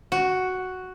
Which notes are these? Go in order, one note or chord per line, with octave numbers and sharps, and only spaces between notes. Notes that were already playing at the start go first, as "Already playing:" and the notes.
F#4